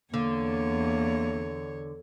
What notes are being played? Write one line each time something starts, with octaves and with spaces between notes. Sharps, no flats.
E2 D3 A#3 C#5